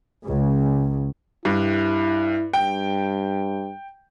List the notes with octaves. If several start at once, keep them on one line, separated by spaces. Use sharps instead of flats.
C#2 C#3
G2 E4
G2 G5